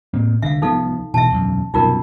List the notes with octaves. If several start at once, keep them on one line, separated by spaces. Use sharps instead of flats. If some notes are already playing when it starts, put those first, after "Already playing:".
A2 A#3 C4
C2 D3 E5 F5
C2 F3 B3 D#4 A4 F5
B1 B2 E3 E5 A5
E1 B1 F#2
C2 F#2 B2 D#4 F4 A#4